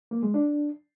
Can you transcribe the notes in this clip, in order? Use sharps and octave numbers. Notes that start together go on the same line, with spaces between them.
A#3
G#3
D4